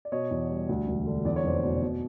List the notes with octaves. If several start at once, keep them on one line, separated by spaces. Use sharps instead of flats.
D5
B2 C#5 D#5
E2
G3
D2
E1
D3
E2 D5
C#5
F1 C5 D5
B2
B2